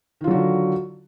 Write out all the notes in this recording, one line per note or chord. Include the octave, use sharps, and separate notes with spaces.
D3 D#3 F#3 F4 F#4